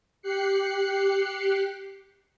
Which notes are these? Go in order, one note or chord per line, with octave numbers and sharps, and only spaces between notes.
G4 F#6 C7 C#7